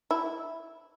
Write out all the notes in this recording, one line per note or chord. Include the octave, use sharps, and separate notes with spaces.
E4